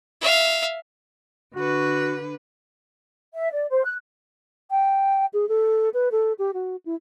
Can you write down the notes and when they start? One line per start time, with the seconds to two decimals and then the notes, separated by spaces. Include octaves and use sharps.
0.21 E5 F5
1.56 D3 F#4 B4
3.34 E5
3.52 D5
3.70 C5
3.84 F#6
4.71 G5
5.33 G#4
5.49 A4
5.94 B4
6.11 A4
6.39 G4
6.54 F#4
6.85 E4